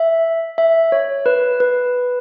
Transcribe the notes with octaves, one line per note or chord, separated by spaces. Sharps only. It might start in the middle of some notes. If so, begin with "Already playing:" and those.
Already playing: E5
E5
C#5
B4
B4